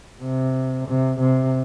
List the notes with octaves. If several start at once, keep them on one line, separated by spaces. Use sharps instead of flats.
C3
C3
C3